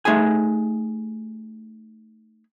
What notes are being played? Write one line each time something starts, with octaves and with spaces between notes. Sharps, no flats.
A3 D#4 G4 G#4 G#5